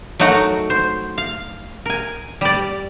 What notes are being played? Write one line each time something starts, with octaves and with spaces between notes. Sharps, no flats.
F#3 A3 D#4 F#4 A#4 F#5
C5
F5
A#4 G#5
G3 D5